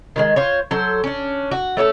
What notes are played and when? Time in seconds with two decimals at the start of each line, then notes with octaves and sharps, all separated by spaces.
0.16 D#3 F#3 G#3
0.36 F4 C5 C#5
0.71 F#3 A4 C5
1.04 C#4 D4
1.51 F#4
1.77 A3 C#4 G#4 A4